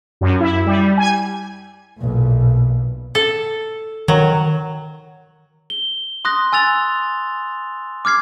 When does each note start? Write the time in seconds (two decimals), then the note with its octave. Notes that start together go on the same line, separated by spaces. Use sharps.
0.21 F#2
0.40 E4
0.66 G3
0.97 G#5
1.99 B1 A#2
3.15 A4
4.08 D#3 F#3
5.70 G7
6.25 C6 D#6 F#6 A#6
6.52 G#5 E6 A6 F7
8.05 D6 F6 G#6 C7